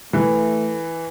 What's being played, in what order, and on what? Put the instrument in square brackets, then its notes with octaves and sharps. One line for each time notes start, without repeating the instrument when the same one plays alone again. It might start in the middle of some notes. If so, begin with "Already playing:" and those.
[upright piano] E3 [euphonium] A3